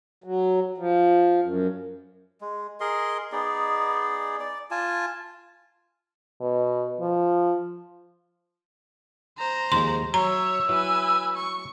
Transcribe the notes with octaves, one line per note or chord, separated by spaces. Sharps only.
F#3
F3
F#2
G#3
G#4 A#4 D#5 C6
B3 D#4 G#4 D5
D5
F4 G#5 A5
B2
F3
C5 A#5
D#2 F3 G#3 C6
F#3 C#5 E5 A#5 E6
F#3 E4 B4 G#5
C#6